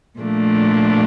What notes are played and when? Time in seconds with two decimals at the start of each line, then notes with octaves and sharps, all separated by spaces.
0.19 A#2 F3 A3 D4